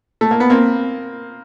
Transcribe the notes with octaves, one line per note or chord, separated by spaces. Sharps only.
A3
A#3
B3
A#3 C4